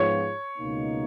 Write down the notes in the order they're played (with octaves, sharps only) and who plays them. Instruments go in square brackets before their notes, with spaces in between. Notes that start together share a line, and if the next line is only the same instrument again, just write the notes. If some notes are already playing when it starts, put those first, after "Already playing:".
Already playing: [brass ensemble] G#2 F3 B3 F4 G#4 [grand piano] C#5
[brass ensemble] C#2 B2 A#3 D#4